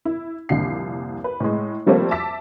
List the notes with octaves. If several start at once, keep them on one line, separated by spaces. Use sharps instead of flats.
E4
C2 F2 A#2 D3 C7
B4
A2 G#3
F3 G3 A3 A#3 C4
E5 A5 D6 E6 B6